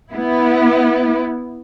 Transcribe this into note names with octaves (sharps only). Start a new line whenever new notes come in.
B3 E4